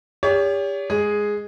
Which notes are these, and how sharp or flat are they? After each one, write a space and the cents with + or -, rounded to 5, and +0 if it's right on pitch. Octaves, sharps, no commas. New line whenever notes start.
G4 +40 C#5 +40
G#3 +0 G#4 +0